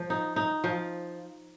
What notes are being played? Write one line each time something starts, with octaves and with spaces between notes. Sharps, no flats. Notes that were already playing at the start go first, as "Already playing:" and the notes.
Already playing: F3
D#4
D#4
F3